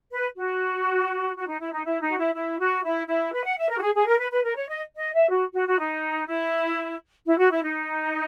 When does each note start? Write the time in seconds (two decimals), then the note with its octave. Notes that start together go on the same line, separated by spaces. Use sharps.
0.13 B4
0.37 F#4
1.36 F#4
1.48 D#4
1.60 E4
1.73 D#4
1.85 E4
2.01 D#4
2.10 F#4
2.17 E4
2.34 E4
2.59 F#4
2.84 E4
3.07 E4
3.33 B4
3.45 F#5
3.57 E5
3.69 A#4
3.78 F#4
3.81 G#4
3.94 G#4
4.06 A#4
4.18 B4
4.31 B4
4.44 A#4
4.56 C#5
4.68 D#5
4.96 D#5
5.13 E5
5.30 F#4
5.53 F#4
5.67 F#4
5.78 D#4
6.27 E4
7.26 E4
7.38 F#4
7.51 E4
7.63 D#4